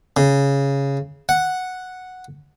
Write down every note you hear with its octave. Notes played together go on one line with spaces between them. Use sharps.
C#3
F#5